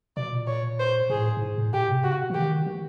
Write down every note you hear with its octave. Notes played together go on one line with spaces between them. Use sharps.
B2 D5
A#2
C#5
C5
A2 G#4
A2
G#2
A2
B2 G4
C3
C#3 F#4
E3
D#3 G4
D#3